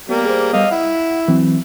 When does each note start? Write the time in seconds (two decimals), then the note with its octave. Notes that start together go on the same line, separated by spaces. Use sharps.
0.09 G3 A#3 B3
0.25 G#4 C5
0.53 G3 B3 D#5 F5
0.71 E4 F#5
1.28 E3 F#3 C4